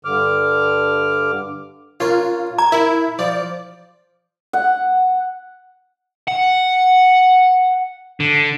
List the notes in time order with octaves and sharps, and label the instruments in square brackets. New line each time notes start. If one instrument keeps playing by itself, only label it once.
[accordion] G2 D3 D6 F6
[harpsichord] C#4 D4 A#4 [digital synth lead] F4
[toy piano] A#5 [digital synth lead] G#6
[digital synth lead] E4 [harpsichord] A#4
[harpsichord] F3 [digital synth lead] D5
[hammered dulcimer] F#5
[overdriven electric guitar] F#5
D3